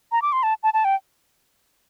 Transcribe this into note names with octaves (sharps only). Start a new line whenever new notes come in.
A#5
D6
C6
A5
A5
A5
G5